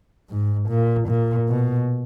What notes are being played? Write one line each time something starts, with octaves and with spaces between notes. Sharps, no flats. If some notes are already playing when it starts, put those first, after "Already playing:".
G#2
A#2
A#2
B2